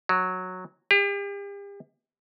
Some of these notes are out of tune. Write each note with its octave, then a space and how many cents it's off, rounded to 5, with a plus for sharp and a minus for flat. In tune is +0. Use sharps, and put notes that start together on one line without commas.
F#3 -10
G4 +40